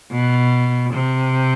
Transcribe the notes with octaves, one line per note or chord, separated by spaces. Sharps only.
B2
C3